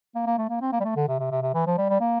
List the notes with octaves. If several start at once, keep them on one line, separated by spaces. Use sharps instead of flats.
A#3
A#3
A3
A#3
C4
A#3
G3
A3
D3
C3
C3
C3
C3
E3
F3
G3
G3
A#3